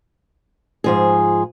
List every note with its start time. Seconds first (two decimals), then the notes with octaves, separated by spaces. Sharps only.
0.84 G#2 F3 G#4